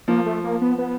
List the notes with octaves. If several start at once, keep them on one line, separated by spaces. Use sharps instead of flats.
F3 A#3
A3
A#3
B3
B3